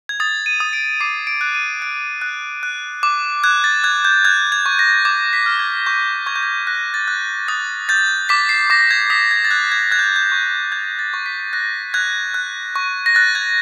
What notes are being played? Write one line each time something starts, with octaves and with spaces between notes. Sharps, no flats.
G#6
D#6 A6
D#7
D#6
D7
D6 C7
D7
F#6
D#7
F#6 D7
F#6
F#6
D6
F#6 G#6
A6
F#6 G#6
G6
F#6 G#6
G#6
C#6
A#6
D6 G#6
B6
F6
G#6
C#6 G6
C#6 G#6
G6
G#6
F#6 A#6
A6
F#6
D#6 A6
G6 A6
D6 B6
C7
D6 A#6
G#6
D#6 B6
G#6
A6
F#6 G#6
G#6
F#6 G#6
G6
G6
C#6
G6 G#6
A6
C#6
B6
F#6 A#6
F#6 G#6
F#6
C#6
A#6
F#6 A6
G#6